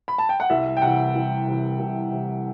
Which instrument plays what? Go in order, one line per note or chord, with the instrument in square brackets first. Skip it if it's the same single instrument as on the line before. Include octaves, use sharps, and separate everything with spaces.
[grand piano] B5
A5
G5
F#5
C2 E5
G5
C3 E3 F#5
C2
C3 E3
C2
C3 E3